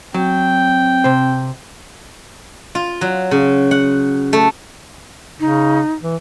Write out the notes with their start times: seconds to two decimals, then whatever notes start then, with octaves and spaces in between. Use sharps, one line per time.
0.14 F#3 C4 G5
1.04 C3 C5
2.75 F4
3.01 F#3
3.31 C#3
3.71 F#5
4.33 A3
5.40 C#3 D#4
6.02 E3